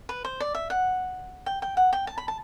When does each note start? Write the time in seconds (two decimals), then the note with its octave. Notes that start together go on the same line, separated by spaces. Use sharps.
0.09 B4
0.25 C5
0.40 D5
0.54 E5
0.70 F#5
1.46 G5
1.62 G5
1.77 F#5
1.93 G5
2.07 A5
2.18 B5
2.28 A5